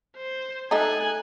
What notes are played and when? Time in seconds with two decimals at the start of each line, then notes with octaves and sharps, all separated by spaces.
0.17 C5
0.71 A3 D#4 G#5 F#6